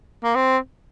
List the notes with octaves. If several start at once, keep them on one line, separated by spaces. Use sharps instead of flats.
A#3
C4